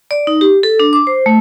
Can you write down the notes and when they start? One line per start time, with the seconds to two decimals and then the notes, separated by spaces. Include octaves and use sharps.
0.11 D5
0.27 D#4
0.41 G4
0.63 A4
0.80 D4
0.93 D6
1.07 C5
1.26 A3